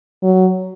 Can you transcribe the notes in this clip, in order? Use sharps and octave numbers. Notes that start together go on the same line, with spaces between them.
F#3